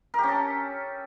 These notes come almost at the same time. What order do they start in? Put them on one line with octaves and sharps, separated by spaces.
A#4 G4 C#4 A4